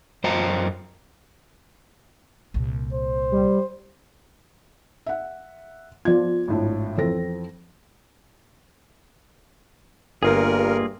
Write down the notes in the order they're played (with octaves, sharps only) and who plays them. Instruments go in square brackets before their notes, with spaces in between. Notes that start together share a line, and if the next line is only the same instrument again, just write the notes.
[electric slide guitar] F#2 C5 D#5 G5 A#5
[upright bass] C2 A#2
[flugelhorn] C5
[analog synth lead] G3
[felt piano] E5 F#5
[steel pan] F3 B3 F4 [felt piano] D5 G#6
[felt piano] G#1 A2 D4
[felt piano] F2 C4 A#6 [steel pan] E3 A4
[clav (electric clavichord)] G1 [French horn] G2 [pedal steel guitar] A#3 F4 G#4 [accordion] A#4